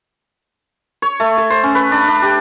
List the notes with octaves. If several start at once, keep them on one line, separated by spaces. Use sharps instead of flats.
C#5
A3
A4
C5
C#4
B4
D4
D4
G4